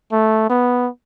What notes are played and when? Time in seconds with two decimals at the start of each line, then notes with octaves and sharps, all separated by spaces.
0.12 A3
0.49 B3